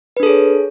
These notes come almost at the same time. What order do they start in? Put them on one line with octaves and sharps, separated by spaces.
B4 D4 A4 G#4 C#5